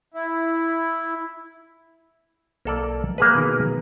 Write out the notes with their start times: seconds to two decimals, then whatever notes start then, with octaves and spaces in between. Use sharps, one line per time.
0.14 E4
2.65 B1 A#3 A4 D5
3.18 A#3 G#4 B4
3.35 B2 D#3